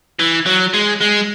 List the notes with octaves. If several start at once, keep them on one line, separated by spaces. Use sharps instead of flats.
E3
F#3
G#3
G#3